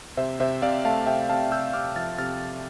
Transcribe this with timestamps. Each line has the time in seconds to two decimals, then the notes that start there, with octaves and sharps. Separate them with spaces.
0.17 C3 C5 E5
0.40 C3 C5 E5
0.62 C3 D5 F5
0.85 A3 F5 A5
1.06 C3 E5 G5
1.29 C3 F5 A5
1.51 C3 E6 G6
1.73 C3 D6 F6
1.96 F3 F6 A6
2.18 C3 F6 A6